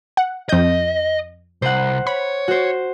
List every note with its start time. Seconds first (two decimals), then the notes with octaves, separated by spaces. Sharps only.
0.17 F#5
0.49 F2 D#5 G6
1.62 C2 C5 F#5
2.07 C#5 B5
2.48 F#4 C5